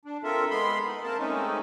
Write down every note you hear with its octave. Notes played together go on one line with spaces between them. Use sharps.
D4
C4 F4 A4 A#4 E5
G#3 B3 B5 C6
D#4
A#3 C4 A#4 A5
G#3 A3 C4 C#4 D#4